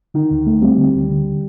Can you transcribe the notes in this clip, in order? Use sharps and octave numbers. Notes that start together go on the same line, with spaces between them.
D3 D#3
D2
A3
G3 C4
D3
D2
D3